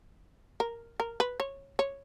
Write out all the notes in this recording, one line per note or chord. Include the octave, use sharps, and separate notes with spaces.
A#4
A#4
B4
C#5
C#5